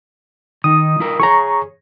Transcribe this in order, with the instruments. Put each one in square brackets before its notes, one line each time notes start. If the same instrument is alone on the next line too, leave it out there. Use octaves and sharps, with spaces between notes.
[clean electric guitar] D#3 D#4 [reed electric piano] D#6
[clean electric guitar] F3 E4 A#4
[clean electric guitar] G#4 A4 C#5 [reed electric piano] A#5 C#6